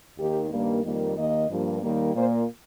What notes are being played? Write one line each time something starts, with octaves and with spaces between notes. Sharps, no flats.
D#2 D#3 A#3 G4
G2 D#3 G3 A#3
F2 D#3 G3 A#3
D#2 D#3 A#3 D#5
G2 F3 A#3
D#2 D#3 G3 A#3
A#2 A#3 C5